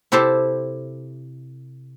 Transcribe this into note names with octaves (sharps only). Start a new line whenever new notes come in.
C3 E4 G4 A4 C5